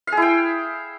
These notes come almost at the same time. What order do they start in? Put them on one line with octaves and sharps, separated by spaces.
F5 G#4 E4 G5